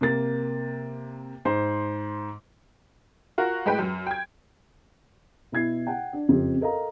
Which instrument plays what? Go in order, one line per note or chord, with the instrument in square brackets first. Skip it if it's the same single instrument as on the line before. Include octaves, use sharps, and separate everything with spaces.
[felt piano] C3 A#3 A6
G#2 C5 C6
[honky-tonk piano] F4 F#4 A#4
A2 G#3 B4 G5
F#2
G5 G#6
[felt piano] B2 E4 G#6 C7
F#5 G5
D4
F#1 F2 G4
A4 A#4 D#5 F5 A#5